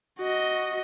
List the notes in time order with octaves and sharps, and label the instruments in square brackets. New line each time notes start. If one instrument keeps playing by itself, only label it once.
[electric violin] F#4 D#5